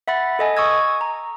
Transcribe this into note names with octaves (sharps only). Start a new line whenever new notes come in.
E5 F#5 B5 A6
A4 D#5 G#5
C#6 D#6 E6 G#6
A#5